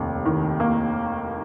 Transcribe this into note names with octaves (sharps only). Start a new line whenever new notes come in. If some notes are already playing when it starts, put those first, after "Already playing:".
Already playing: F1 D#2
D#3
A#3